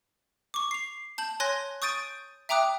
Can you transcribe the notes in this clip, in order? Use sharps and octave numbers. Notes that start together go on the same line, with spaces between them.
C#6 D6
C7 F7
A5 G6 F#7
C#5 G#5 C6 F#6 A#6
C#6 D#6 G6 A6 D7 D#7
E5 G5 A#5 D6 D#6 F#6